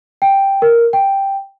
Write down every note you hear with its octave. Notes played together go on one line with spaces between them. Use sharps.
G5
A#4
G5